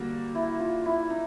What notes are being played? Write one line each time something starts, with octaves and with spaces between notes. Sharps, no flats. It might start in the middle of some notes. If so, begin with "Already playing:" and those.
Already playing: D3 G3 A#3 F#4
E4
F4
E4
D#4